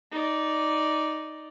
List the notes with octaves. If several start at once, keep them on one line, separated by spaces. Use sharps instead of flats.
D#4 D5